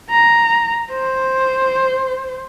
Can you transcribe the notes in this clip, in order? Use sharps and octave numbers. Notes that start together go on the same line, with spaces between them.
A#5
C5